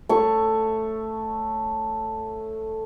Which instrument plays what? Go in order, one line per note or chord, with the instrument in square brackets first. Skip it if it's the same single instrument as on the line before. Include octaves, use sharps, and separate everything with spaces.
[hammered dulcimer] A3 C#5 C#6